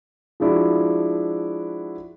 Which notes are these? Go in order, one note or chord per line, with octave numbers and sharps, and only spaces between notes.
F3 G#3 D4 E4 F#4